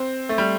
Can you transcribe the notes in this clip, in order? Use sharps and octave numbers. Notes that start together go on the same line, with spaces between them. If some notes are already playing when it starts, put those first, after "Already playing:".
Already playing: C4
A3
G3